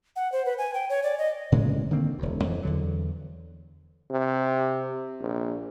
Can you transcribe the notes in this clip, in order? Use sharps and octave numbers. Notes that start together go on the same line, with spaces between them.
F#5
C5
B4
G#5
G5
C#5
D5
D#5
A2 C#3 E3 G#3
D3 D#3 A#3 C4
E1 D2
F2 E3
E2 D3 F#3
C3
A#1